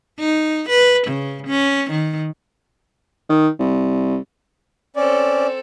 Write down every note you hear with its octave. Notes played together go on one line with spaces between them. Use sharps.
D#4
B4
C#3
C#4
D#3
D#3
C2
C4 C#4 A4 D5